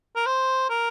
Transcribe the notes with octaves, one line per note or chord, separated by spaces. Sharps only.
A#4
C5
A#4